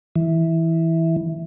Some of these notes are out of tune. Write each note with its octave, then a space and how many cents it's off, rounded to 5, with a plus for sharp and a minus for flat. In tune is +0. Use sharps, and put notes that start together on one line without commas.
E3 -10